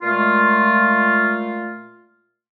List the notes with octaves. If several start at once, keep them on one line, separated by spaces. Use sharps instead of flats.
A#2 G#3 A3 F4